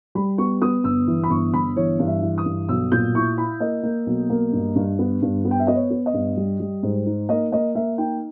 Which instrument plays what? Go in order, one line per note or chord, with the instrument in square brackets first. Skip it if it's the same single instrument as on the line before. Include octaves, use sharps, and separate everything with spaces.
[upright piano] G3 B5
B3 C#6
B3 D#6
G1 E6
E3
B5
G1 C#6
G1 B5
E3 C#5
G2
E5
E3
D#6
G2
B1 E6
A#2 G6
E4 C#6
E4 B5
A#3 D#5
A#3
B1
A#3
G2
G2
B3
G2
B3
G5
E5
B3 D#5
C#5
B3
D#5
G2
G3
G3
G#2
D#4
A#3 D#5
A#3 D#5
A#3 E5
D#4 G5